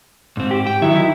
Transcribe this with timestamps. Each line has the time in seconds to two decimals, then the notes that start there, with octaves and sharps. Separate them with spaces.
0.37 G#2 C4
0.51 G4
0.67 G5
0.82 D#3 F#3 E4 E5
0.96 E4